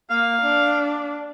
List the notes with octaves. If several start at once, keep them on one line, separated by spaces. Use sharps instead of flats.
A#3 F5
D4